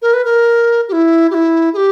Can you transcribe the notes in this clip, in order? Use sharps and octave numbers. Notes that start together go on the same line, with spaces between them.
A#4
B4
A#4
G4
E4
G4
E4
G#4
G4